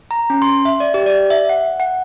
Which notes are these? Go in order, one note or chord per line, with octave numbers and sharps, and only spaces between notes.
A#5
C#4
C6
E5
D5
G4
D5
E5
F#5
F#5